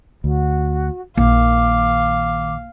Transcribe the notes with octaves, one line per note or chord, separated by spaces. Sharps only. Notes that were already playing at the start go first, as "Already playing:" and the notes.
D2 F#4
A#1 D#3 A#3 F5 D6